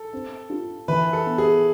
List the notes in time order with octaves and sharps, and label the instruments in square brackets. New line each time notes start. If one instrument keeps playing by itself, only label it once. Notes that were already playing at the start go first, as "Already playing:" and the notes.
Already playing: [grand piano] A4
[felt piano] C4
F4
[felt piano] E3 [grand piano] B4
[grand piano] A4
[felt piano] B3
[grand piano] G#4